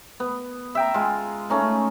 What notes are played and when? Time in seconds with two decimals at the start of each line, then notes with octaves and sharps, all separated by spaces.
0.20 B3
0.75 E5 G5 A#5
0.94 G#3 F4
1.50 A3 C#4 D#4